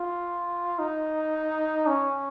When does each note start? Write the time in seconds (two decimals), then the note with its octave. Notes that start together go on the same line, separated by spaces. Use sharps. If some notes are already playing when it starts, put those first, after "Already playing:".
Already playing: F4
0.79 D#4
1.87 C#4